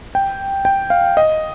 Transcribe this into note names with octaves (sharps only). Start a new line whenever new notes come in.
G5
G5
F5
D#5